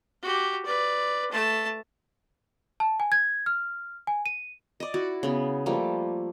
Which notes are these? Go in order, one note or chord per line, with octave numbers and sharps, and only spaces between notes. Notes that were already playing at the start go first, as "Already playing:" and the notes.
F#4 G4
B4 D5
A3 A5
A5
G#5
G#6
F6
G#5
D#7
D5 D#5
E4 F#4
C#3 B3
F3 G3 A3 A#3